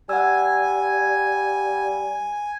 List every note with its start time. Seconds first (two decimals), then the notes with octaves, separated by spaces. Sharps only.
0.09 G3 F#5 G#5 E6